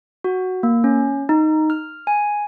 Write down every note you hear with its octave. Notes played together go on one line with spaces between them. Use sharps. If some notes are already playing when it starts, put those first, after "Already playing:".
F#4
A#3
C#4
D#4
F6
G#5